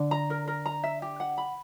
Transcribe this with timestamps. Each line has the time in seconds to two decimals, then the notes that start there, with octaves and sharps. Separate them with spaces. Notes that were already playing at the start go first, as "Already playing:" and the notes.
Already playing: D3
0.11 A#5
0.30 A#4
0.48 A#4
0.66 A#5
0.84 E5
1.02 G4
1.20 F#5
1.38 B5